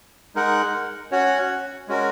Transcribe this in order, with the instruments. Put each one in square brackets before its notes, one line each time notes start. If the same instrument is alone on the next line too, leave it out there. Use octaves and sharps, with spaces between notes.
[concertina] G#3 D#4 A#4 F#5
C#4 F#4 C#5 F#5
G#3 C#4 F#4 A#4